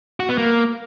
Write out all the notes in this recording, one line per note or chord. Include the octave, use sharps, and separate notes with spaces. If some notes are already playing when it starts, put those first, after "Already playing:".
F#4
B3
A#3